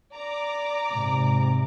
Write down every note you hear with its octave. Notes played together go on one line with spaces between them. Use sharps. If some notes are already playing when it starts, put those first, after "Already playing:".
D5 A#5 D6
G#2 C3